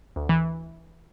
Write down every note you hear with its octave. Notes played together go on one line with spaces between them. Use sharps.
D2
E3